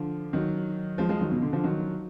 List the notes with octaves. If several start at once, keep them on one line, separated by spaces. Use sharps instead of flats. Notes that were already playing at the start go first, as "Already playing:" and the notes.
Already playing: D3 F3
D#3 F#3
F3 G#3
F3 G#3
D#3 F#3
B2
D3
D3 F3
D#3 F#3